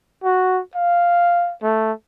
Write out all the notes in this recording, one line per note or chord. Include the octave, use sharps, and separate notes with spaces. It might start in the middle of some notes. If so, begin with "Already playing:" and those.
F#4
F5
A3